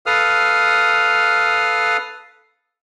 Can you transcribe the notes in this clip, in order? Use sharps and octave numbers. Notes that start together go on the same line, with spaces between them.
A4 B4 F5 D#6 F6